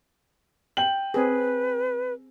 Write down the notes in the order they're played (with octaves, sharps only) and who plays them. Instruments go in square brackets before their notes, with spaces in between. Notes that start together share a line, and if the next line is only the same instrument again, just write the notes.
[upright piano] G5 F#7
[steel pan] C4 G#4 [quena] B4